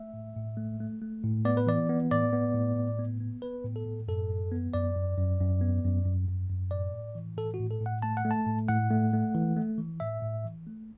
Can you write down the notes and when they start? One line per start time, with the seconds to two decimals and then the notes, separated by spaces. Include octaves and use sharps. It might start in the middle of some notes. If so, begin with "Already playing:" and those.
Already playing: A3 E5
0.13 A2
0.36 A2
0.57 A3
0.80 A3
1.02 A3
1.24 A2
1.45 B3 D5
1.57 B4
1.67 E3 D5
1.90 B3
2.11 A2 D5
2.33 B3
2.55 A2
2.76 A2
2.99 B3
3.20 B3
3.42 B3 B4
3.64 A2
3.76 A4
3.86 A2
4.08 F#2 A4
4.30 F#2
4.52 B3
4.74 F#2 D5
4.95 F#2
5.17 F#2
5.40 F#2
5.61 B3
5.84 F#2
6.05 F#2
6.28 F#2
6.50 F#2
6.71 A2 D5
6.94 A2
7.15 E3
7.37 A2 A4
7.54 F#4
7.60 A2
7.71 A4
7.81 A2
7.86 F#5
8.02 A3 A5
8.17 F#5
8.25 A3
8.31 A5
8.46 A2
8.68 A2 F#5
8.90 A3
9.13 A3
9.35 E3
9.56 A3
9.78 E3
10.00 A2 E5
10.22 A2
10.45 E3
10.67 A3